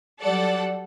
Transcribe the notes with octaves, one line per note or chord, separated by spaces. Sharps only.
F#3 G3 A4 D5 F#5